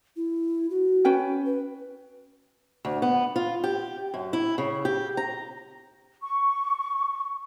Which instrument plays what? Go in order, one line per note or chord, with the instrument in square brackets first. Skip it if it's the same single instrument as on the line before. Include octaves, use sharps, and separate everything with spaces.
[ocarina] E4
F#4
[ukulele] C#4 B4 G5
[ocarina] B4
[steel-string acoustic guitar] D2
B3
F4
G4
F#2
E4
C#3
G4
A#5
[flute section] C#6